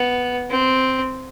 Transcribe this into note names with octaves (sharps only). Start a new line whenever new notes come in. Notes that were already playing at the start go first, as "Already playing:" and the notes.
Already playing: B3
C4